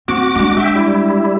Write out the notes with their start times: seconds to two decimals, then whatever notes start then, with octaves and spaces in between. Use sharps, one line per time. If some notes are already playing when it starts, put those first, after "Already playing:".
0.08 C4 F#4 D6
0.35 G#3 D4
0.57 E5 G5
0.75 G3 E4